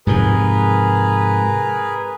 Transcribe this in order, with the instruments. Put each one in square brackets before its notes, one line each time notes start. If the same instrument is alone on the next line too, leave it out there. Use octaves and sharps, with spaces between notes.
[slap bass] G#2 C3 F3 [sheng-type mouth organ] G#4 A#4 B4